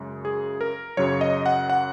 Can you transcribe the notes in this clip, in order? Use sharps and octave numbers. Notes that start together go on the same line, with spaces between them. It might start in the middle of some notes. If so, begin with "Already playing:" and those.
Already playing: F#2 C#3 G#3
G#4
A#4
F#2 C#3 F#3 C#5
D#5
F#5
F#5